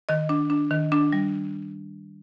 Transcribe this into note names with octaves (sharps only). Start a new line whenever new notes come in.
D#3 D#5
D4
D4
D#3
D4
G3